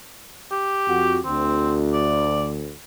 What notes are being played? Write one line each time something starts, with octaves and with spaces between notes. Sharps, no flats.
G4
F2 F#4
D2 C4
D5